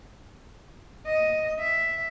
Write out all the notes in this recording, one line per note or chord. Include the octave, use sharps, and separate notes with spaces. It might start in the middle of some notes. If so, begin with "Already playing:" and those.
D#5
E5